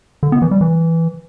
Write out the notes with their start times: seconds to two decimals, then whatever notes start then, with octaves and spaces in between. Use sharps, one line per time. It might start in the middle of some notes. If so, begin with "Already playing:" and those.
0.23 D3
0.32 B3
0.42 E3
0.51 G3
0.61 E3